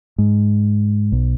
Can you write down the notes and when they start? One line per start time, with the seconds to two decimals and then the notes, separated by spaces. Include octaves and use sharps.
0.18 G#2
1.12 B1